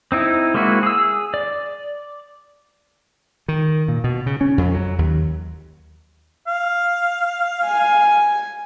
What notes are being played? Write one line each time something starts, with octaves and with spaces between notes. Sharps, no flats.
C4 D#4 E4
G#3 A#3 C4 E4 F#4
G#4 E6
D5
D#3
A#2
B2
C#3
C#4
F2
F#3
D#2
F5
G#5